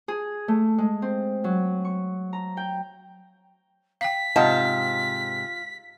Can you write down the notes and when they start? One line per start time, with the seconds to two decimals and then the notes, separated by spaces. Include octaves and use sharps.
0.08 G#4
0.48 A3
0.78 G#3
1.02 C4
1.44 F#3
1.85 C#6
2.33 A#5
2.57 G5
4.01 F5 G5 B6
4.36 G#2 C3 F4 D#5 F#5 A5